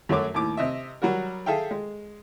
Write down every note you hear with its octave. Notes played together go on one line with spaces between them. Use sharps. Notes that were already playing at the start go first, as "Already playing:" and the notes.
F#2 F#3 A3 F#4 C#5 D6
D#2 A2 D6
C3 D#5 E5
F#3 G3 F#4 A#4
G#4 A4 E5 F5 G5
G#3